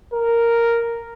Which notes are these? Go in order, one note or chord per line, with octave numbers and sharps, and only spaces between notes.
A#4